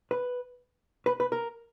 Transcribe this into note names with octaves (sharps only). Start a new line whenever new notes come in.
B4
B4
B4
A#4